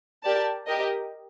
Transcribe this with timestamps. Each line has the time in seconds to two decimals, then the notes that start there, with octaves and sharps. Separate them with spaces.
0.23 G4 A#4 D5 A5
0.66 G4 A#4 D#5